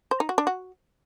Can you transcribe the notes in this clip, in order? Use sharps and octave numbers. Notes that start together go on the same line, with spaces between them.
C5
D#4
F#4
D4
F#4